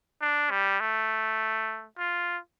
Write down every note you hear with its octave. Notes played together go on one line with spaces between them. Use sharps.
D4
G3
A3
F4